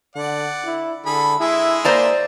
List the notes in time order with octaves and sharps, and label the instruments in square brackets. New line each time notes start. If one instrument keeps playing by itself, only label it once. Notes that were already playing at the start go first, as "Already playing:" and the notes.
[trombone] D3 [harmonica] D5 F#5
[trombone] E4
[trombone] D3 [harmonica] G#4 A4 B5
[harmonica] G#3 G#4 E5 [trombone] E4
[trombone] A#3 [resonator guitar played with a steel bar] C5 D5 A#5